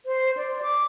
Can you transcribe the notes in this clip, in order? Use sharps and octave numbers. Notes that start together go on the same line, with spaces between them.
C5
D5
D6